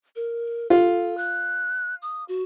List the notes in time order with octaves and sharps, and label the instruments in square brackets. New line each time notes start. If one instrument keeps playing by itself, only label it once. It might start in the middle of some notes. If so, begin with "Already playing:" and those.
[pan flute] A#4
[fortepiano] F4 [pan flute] A4
[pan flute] F#6
D#6
F#4